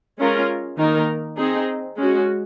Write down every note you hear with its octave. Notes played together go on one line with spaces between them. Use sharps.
G#3 C#4 F4 A#4
D#3 A#3 D#4 A#4
C4 D#4 G#4
G#3 C#4 F#4